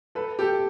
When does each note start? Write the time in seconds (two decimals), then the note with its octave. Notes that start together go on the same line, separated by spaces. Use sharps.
0.15 A4 B4
0.39 G4 A4